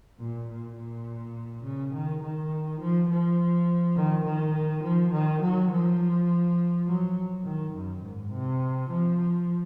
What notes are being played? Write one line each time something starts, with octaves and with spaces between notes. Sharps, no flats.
A#2
A#2
A#2
C#3
D#3
D#3
F3
F3
D#3
D#3
F3
D#3
F#3
F3
F#3
D#3
F#2
G#2
C3
F3